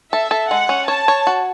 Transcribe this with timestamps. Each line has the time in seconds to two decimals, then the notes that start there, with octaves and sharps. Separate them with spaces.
0.12 A4 E5
0.31 A4
0.50 G#3 F#5
0.69 C#4
0.88 C#5 A5
1.08 C#5
1.27 F#4